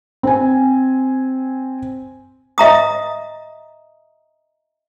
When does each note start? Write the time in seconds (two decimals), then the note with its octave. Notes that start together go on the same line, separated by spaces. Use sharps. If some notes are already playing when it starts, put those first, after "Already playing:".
0.23 C4 G#5
2.58 D#5 E5 A#5 D#6